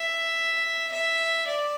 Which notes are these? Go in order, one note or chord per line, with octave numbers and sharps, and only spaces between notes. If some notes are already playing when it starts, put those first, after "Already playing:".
Already playing: E5
E5
D5